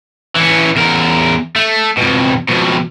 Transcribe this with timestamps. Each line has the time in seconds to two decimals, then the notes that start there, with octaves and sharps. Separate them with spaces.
0.36 E3 C#4
0.77 E2 A#4
1.56 A3
1.98 F2 B2
2.49 F2 B2